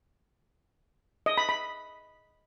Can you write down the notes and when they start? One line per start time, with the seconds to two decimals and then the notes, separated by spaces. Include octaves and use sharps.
1.26 D#5
1.38 B5
1.49 B5